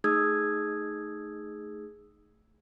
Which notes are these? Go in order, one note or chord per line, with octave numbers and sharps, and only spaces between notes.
A3 D#4 G#4 D#6 E6 G#6